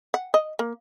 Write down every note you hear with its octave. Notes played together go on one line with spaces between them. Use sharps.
F#5
D#5
A#3